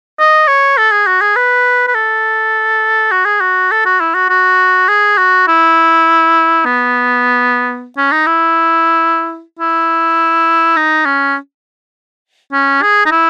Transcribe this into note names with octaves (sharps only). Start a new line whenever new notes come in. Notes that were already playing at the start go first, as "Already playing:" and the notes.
D#5
C#5
A4
G#4
F#4
G#4
B4
B4
A4
F#4
G#4
F#4
A4
F#4
E4
F#4
F#4
G#4
F#4
E4
B3
C#4
D#4
E4
E4
D#4
C#4
C#4
G#4
D#4
E4